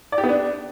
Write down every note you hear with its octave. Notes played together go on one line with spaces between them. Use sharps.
D5
G4
B3
D4